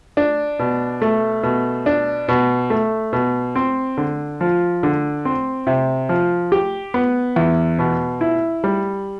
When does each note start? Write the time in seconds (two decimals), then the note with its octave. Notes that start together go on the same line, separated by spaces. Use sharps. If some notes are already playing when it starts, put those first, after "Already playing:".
0.17 D4
0.59 B2
1.02 A3
1.43 B2
1.86 D4
2.28 B2
2.70 A3
3.13 B2
3.56 C4
3.98 D3
4.41 F3
4.83 D3
5.25 C4
5.67 C3
6.09 F3
6.52 G4
6.94 B3
7.36 E2
7.79 B2
8.21 E4
8.64 G3